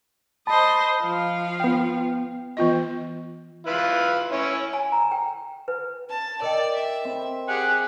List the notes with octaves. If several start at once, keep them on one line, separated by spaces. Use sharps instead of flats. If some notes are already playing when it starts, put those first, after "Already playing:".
C5 D#5 A5 B5
F3 F5
B3 G5
E3 B3 F4 D#5
E4 F4 B4
C#4 E4
G#5
A#5
G5
B4
A5
A#4 D5 D#5 G5
E5
C4
G4 G#4 F#5